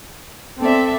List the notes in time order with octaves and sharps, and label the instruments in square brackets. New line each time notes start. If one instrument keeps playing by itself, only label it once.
[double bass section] C4 [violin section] A4 D5 E5